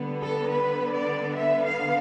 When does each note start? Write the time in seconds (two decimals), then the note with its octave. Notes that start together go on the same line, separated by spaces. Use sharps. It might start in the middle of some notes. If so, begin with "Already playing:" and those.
Already playing: D3 G3 B3
0.23 A4
0.50 B4
0.93 D5
1.36 E5
1.63 F5